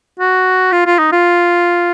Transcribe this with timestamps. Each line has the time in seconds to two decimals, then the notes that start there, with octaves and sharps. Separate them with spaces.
0.19 F#4
0.72 F4
0.86 F4
0.99 D#4
1.12 F4